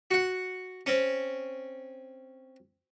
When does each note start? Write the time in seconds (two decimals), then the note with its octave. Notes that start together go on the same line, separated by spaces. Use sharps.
0.11 F#4 F#5
0.86 C4 C#4